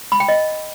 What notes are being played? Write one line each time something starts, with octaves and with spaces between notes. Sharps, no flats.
B5
G5
D#5